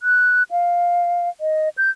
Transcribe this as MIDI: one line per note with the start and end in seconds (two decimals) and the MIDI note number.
0.01 0.43 90
0.51 1.29 77
1.41 1.69 75
1.78 1.90 91